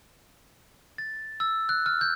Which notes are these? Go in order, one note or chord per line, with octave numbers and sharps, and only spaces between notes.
A6
E6
F#6
F6
G6